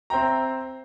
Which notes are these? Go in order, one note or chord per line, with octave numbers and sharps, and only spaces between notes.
C4 C5 E5 G5 A#5